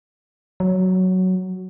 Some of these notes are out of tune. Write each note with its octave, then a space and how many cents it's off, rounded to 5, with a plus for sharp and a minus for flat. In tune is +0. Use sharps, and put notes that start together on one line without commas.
F#3 +5